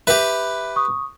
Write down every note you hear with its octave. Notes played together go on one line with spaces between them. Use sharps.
G4 B4 E5
C#6 D#6